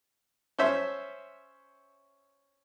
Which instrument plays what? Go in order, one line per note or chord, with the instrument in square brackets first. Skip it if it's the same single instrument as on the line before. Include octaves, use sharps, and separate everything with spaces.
[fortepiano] C#4 C5 E5